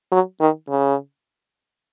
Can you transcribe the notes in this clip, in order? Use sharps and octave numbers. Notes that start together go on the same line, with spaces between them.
F#3
D#3
C#3